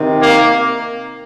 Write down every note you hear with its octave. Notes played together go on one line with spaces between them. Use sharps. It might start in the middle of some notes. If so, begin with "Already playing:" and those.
Already playing: C3 D#3
A#3